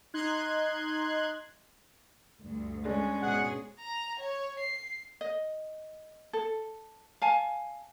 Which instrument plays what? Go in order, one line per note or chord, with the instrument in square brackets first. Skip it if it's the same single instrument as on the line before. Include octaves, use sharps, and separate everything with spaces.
[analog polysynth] D#4 C6 F#6 G#6
[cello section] D2 G2
[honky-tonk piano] G#3 D4 [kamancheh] C#4
[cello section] G#2 B2 G#4 [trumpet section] F#5
[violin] A#5
C#5
C7
[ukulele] D#5
A4
F5 G#5 A5